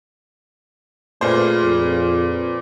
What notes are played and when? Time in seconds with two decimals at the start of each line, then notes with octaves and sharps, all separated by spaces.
1.21 A#2 A3 F4 G#4 B4 C5
1.64 F2